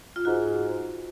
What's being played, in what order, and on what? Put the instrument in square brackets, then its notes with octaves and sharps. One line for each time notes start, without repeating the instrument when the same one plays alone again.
[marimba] F4
[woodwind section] G#2 [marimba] F#4